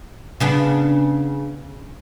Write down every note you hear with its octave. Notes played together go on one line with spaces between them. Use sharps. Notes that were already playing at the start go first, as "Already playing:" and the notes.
C#3 B3 D4